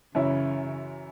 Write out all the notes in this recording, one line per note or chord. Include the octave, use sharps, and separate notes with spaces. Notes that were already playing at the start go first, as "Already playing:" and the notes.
F#2 C#3 E3 C#4 E4 C#5